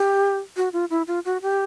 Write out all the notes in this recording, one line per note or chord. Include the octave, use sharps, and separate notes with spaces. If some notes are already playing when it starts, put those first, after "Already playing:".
Already playing: G4
F#4
F4
E4
F4
F#4
G4